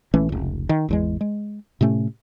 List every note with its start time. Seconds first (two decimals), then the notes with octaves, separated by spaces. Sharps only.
0.14 A#1 E3 A3 C#4
0.29 F1 C#2
0.69 D#3
0.89 G#1 E2 G#3
1.21 G#3
1.81 A2 C3 A3 C#4